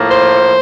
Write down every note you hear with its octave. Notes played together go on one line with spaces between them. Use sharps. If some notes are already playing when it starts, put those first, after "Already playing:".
Already playing: A2 F3 A#3
C5